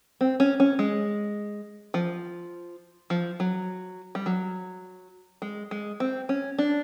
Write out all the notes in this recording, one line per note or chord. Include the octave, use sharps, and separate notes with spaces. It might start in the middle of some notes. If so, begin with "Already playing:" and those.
C4
C#4
C#4
G#3
F3
F3
F#3
G3
F#3
G#3
G#3
C4
C#4
D4